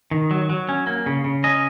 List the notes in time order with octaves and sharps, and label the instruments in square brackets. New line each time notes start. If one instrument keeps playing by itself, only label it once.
[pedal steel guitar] D#3
F#3
F#3
C#4
A#3
C#3
C#3
C#4 D#5